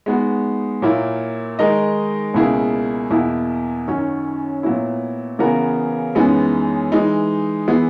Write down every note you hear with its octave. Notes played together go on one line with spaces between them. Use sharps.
G#3 B3 D#4 F#4
A#2 F#3 A#3 E4
D#3 G#3 D#4 A#4 D#5
C#2 B2 A#3 E4 G#4
E2 B2 A#3 E4
F#2 D#3 F#3 C#4
A#2 F#3 B3 E4
C#3 E3 B3 F#4 A#4
F#2 E3 G#3 B3 D#4
E3 G#3 D#4
E3 B3 E4 G#4